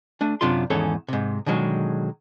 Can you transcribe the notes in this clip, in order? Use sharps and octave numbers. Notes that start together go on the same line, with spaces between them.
A3 D4
F#2 C3 D4 F4 C6
E2 G#2 D#3 C#4 A4 C#5
G#2 C3
B2 D3 D#3 F#3 G#3